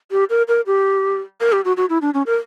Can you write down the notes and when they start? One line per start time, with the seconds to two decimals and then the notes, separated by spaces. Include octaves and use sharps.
0.11 G4
0.30 A#4
0.48 A#4
0.67 G4
1.41 A#4
1.52 G4
1.65 F#4
1.77 F#4
1.89 E4
2.02 D4
2.14 C#4
2.26 A#4